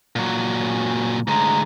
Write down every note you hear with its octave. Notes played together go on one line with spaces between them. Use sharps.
A#2 F#3
C#4
D2 G#3 A#5